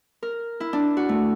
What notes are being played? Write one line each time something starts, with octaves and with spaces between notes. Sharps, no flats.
A#4
E4
D4
F#4
A3